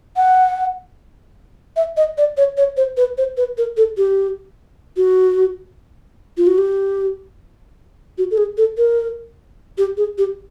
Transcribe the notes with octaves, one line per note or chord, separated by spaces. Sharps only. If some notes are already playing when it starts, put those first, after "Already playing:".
F#5
E5
D#5
D5
C#5
C#5
C5
B4
C5
B4
A#4
A4
G4
F#4
F4
F#4
G4
F#4
A4
G#4
A4
A#4
G4
G#4
G4